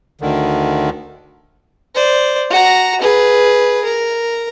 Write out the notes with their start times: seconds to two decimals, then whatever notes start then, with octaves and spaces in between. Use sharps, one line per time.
0.21 D2 D3 D#3
1.95 C5 D5
2.50 F#4 A#5
3.01 G#4 B4
3.84 A#4